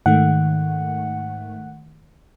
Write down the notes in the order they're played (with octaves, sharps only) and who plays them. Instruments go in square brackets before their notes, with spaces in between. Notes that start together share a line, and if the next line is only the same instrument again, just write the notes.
[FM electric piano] G#2 D#3 A3 [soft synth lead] F#5